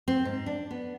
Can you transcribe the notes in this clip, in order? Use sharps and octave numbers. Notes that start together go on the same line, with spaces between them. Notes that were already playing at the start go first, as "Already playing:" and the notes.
C4
G#2
D4
B3